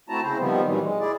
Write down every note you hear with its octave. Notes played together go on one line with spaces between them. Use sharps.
A3 C4 E4 F#4 A5 A#5
C#3 C4 E4 C5
D#3 F3 G3 B3 C4
A#2 D#3 E3 F#3 G3
G#3
E4 G#4 D5